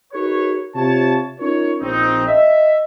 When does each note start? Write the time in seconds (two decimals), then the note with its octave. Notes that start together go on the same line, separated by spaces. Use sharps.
0.12 D#4 F#4 G#4 A#4 B4 C#5
0.75 C3 F4 C#5 A5
1.40 C#4 D#4 F4 A#4 C#5
1.80 A#1 C4 D#4
2.28 D#5 E5